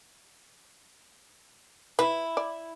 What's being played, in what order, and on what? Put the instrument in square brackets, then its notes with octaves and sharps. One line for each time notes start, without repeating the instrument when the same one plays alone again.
[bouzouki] E4 [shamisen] B4
[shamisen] D5